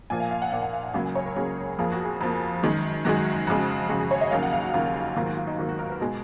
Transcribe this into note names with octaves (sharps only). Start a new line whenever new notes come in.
A#2 F3 A#3 G#5
F5
F5
F#5
A#2 F3 A#3 F#5
F#5
F5
F5
C#2 C#3 F#3 A#3 G#5
G#5
C#5
A#4
C#2 C#3 F#3 A#3 G#4
F2 F3 A#3 G#4
F#4
G#4
F2 F3 A#3
F#2 D#3 G#3
F#2 D#3 G#3 F#4
F2 C#3 G#3 F#4
F2 C#3 G#3 F#4
G#4
C#5
D#5
D#2 C#3 F#3 A#3 F5
F#5
F5
F#4
D#2 C#3 F#3 A#3 F4
G#2 D#3 F#3 A#3 F4
F#4
F4
D#4
G#2 D#3 F#3 A#3 F4
F#4
A#4
B4
B2 G#3